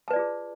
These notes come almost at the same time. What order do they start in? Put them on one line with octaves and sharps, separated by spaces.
A5 B4 D5 F4 G#4